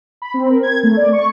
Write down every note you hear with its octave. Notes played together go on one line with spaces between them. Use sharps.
B5
C4
A#4
G#6
A3
D5
C#6